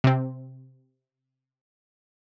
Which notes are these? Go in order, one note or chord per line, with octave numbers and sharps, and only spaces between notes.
C3 C4